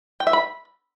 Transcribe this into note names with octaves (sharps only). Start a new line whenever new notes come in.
G5
E5
B5